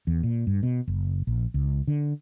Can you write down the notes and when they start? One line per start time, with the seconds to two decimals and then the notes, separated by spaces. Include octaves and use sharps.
0.07 E2
0.23 A#2
0.47 G2
0.63 B2
0.88 F#1
1.27 A#1
1.54 C#2
1.87 D3